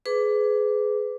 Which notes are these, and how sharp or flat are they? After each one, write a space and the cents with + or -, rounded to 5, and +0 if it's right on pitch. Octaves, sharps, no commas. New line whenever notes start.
G#4 +20 B4 +25 D6 -10